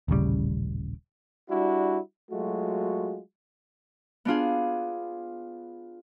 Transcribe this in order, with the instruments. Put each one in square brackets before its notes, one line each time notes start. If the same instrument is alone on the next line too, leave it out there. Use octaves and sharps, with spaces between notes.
[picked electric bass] D#1 A1 C#3 G3
[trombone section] G3 D4 E4 F#4
F#3 G#3 A3 F4 F#4
[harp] B3 D4 F4 G#4